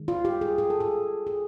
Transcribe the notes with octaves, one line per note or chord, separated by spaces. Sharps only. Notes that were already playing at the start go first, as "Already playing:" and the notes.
Already playing: D#3 G#3
F4
G4
G#4
G#4
A4
G#4
G#4